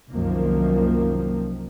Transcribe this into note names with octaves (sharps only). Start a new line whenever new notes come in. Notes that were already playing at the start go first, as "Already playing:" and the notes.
C2 F#2 D#3 F3 A#3